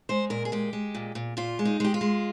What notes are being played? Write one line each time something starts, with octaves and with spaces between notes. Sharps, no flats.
G#3 C5
A#2 A#4
G#4
G#3 G4
G#3
A#2
A#2
A#2 F4
G#3
D#4
G#3 G4
F4
G#3